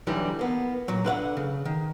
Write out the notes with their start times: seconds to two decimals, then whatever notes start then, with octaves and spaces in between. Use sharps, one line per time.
0.07 D3 E3 F#3 G3 D#4
0.39 A#3 B3
0.88 A#2 F#3
1.04 D3 B4 F5 F#5
1.37 C#3
1.65 D#3